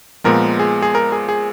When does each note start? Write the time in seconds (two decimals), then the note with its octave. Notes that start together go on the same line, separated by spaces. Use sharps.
0.24 A#2 F3 G#3 B3 A#4
0.59 G#4
0.82 G#4
0.95 A#4
1.12 G#4
1.29 G#4